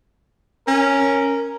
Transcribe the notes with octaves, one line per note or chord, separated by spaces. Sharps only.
C#4 A#4